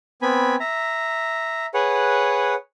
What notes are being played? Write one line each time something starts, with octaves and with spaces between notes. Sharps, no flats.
B3 C4 G#5 B5
E5 A#5
G#4 B4 C#5 F#5